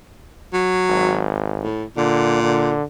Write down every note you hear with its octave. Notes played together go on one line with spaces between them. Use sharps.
F#3
G#1
A2
A#2 D3
D3